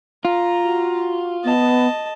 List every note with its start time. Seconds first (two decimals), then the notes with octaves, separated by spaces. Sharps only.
0.25 F4 A#5
0.64 F#4
1.44 B3 D#5 A5